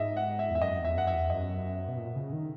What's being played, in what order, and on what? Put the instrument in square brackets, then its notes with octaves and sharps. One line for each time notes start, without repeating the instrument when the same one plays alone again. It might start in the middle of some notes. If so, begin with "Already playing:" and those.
Already playing: [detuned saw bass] G#2 [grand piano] D#5 E5
[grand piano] F#5
E5
[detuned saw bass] E2 [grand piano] E5
[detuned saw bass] F#2 [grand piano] D#5
[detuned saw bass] E2
[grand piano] E5
[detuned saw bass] F#2 [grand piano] F#5
[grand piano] E5
[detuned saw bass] E2
[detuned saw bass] F#2 [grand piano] D#5
[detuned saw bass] B2
A#2
C#3
D#3